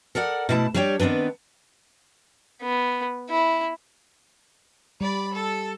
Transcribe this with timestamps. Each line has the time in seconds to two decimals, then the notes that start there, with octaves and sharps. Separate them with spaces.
0.15 A4 A#4 D5 F#5
0.49 B2 A3 E4 G#5 A5
0.74 G3 D4 G4 C#5 G5
1.00 D#3 B3 C4 D4 B4
2.62 B3
3.30 E4
5.01 G3 D5 B5
5.34 A4